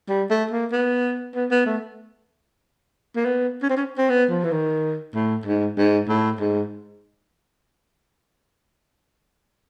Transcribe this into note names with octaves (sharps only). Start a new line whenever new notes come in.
G3
A3
A#3
B3
B3
B3
A3
A#3
B3
C#4
C4
C#4
C4
B3
F3
E3
D#3
A2
G#2
G#2
A2
G#2